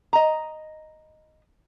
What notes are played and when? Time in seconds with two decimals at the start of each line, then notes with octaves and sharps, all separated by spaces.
0.13 D#5 A#5